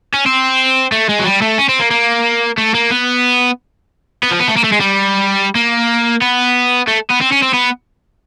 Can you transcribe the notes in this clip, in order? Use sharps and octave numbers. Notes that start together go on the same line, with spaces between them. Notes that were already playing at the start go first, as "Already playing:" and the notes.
C#4
C4
A3
G#3
F#3
G3
A3
C#4
C4
A#3
A#3
A3
A#3
B3
B3
F3
B3
A3
A#3
A3
G#3
G3
A#3
B3
A3
B3
C4
C#4
C4
B3